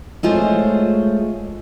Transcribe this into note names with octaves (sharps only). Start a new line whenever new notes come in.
G#3 A3 F4 G#4 C5 C#5